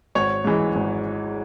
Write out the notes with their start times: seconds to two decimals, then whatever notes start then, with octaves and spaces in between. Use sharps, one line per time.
0.15 G#1 C#5
0.44 G#2 E3 G#3
0.75 G#1